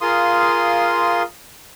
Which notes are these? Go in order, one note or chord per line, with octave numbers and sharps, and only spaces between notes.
F4 G#4 A#4 F5 C6 D#6